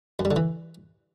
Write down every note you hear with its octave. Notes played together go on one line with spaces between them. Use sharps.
F#2
G3
D3
E3